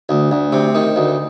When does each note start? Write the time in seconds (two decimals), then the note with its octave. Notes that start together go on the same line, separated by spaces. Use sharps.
0.09 D2
0.31 D2
0.52 C3
0.75 D#3
0.96 D2